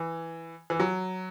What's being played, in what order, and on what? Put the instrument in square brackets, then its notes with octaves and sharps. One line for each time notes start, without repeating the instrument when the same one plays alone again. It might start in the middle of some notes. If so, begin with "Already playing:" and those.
Already playing: [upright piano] E3
E3
F#3